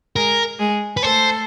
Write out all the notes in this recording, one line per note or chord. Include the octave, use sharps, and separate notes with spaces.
G#3 G#4 A#4
G#3 G#4
B4
A3 A4 C5